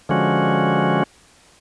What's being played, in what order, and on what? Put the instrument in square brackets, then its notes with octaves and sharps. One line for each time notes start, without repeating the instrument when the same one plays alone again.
[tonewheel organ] D3 F3 G#3 C#4 F#4